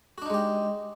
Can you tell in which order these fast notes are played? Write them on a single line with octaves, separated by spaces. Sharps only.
F#4 D4 D#4 G#3 G4